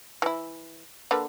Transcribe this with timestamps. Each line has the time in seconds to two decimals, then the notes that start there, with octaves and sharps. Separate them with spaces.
0.22 E3 E4
1.11 D3 A#3 B4